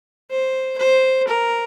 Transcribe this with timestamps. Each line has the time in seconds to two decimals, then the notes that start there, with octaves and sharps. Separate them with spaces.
0.31 C5
0.78 C5
1.28 A#4